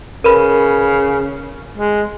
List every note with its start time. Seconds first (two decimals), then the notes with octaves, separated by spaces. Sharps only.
0.24 C#3 A#4 B4 B5
1.77 G#3